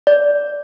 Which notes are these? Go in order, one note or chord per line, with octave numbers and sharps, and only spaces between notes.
D5